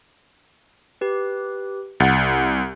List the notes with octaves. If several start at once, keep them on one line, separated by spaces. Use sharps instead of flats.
G4 B4
C2 F#5 A6